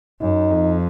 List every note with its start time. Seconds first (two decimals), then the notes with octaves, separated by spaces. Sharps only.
0.21 F#2 D#4
0.51 F2